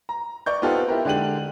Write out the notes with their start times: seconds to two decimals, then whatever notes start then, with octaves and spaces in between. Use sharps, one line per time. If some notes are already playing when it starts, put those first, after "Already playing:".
0.09 A#5
0.46 D5 C#6 G6
0.62 B3 C4 D#4 F4 G4 A4
0.88 E4 G4 A#4
1.05 D3 G#3 D4 G4 D#7 F#7